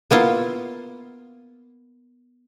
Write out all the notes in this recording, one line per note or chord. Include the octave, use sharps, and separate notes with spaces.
A#3 B3 E4 F4